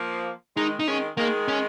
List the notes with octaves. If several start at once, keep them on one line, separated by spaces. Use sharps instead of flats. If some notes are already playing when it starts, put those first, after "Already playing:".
Already playing: F3 A#3
D#3 G#3 D#4
D#4
D#3 G#3 C#4
D#3 G#3 A#3
C#4